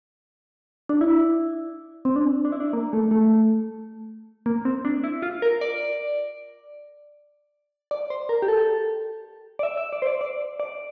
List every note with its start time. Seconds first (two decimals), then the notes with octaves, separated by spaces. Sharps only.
0.89 D4
1.01 E4
2.05 C4
2.16 D4
2.45 D4
2.52 E4
2.60 D4
2.73 A#3
2.93 A3
3.11 A3
4.46 A#3
4.65 C4
4.85 D4
5.04 E4
5.22 F4
5.42 A#4
5.61 D5
7.91 D5
8.10 C5
8.29 A#4
8.42 G4
8.48 A4
9.59 D5
9.63 E5
9.77 E5
9.93 D5
10.02 C5
10.07 D5
10.21 D5
10.60 D5